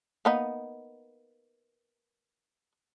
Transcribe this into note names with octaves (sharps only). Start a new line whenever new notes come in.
A#3 B3 D#4